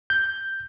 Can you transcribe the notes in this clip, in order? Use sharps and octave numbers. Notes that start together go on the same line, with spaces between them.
G6